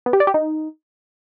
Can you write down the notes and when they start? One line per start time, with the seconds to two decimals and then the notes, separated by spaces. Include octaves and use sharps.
0.06 B3
0.13 G4
0.20 D5
0.27 G4
0.34 D#4